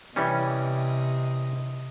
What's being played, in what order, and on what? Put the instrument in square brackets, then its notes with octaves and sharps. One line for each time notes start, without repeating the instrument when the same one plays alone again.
[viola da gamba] C3 D#5 [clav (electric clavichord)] E3 G3 C#4